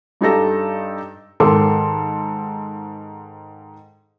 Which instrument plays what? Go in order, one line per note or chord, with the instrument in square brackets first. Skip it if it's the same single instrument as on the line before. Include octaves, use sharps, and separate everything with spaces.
[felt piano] G2 D#4 G4 A4 A#6
[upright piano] G#2 D#3 A4 C6 D6